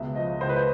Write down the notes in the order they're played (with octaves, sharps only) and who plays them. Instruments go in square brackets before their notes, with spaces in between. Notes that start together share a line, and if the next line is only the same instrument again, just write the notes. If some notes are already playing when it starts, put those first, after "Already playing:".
Already playing: [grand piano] C#2 B2 E5
F3 D#5
C#2 C5
B4
C5